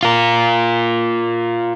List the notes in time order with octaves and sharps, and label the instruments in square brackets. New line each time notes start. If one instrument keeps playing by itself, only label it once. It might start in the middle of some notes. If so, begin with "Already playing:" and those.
[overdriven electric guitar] F4 A#4